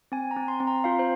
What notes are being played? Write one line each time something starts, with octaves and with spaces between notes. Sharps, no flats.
C4 G#5
A#5
C4
C6
C4
A#5
F4 F5
C5